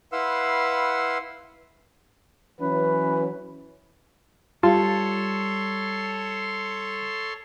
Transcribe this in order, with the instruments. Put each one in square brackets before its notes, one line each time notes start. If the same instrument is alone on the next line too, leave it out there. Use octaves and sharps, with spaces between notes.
[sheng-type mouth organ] E4 B4 F5 F#5 C6 E6
[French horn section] E3 F#3 C#4 [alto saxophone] B4
[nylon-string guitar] G3 [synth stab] F4 [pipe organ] A4 C#5 C6 [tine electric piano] A5